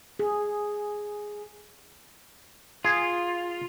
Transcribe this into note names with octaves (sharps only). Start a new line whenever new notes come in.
G#4
F4 G#4